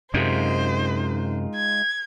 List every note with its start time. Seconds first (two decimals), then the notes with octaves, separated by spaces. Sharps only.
0.14 F#2 C3 G#3 D#4 F4 C5
1.56 G#6